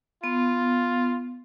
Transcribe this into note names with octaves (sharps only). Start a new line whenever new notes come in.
B3 F4